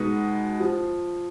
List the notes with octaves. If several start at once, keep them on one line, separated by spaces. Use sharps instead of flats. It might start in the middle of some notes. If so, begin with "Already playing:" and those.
Already playing: B2 G#3 B3 D#4
F3